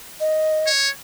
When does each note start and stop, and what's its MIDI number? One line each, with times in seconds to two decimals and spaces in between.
0.20 0.69 75
0.67 0.90 73